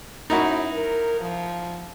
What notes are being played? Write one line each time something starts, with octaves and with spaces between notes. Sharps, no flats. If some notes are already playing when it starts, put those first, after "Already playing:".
F#2 D#4 E4 F#4
A#4
F3